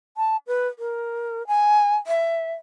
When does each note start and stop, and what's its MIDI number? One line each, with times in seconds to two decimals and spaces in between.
0.17 0.37 81
0.47 0.68 71
0.79 1.46 70
1.47 1.96 80
2.07 2.54 76